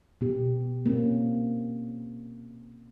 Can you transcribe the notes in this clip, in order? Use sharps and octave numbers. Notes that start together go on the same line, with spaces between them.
B2 B3 G4
A#3 C4 C#4